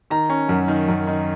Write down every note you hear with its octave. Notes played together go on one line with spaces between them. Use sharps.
D#3 A#5
C#4
F#2
D#3
F#2
D#3